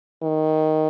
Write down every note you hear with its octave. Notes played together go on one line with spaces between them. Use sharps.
D#3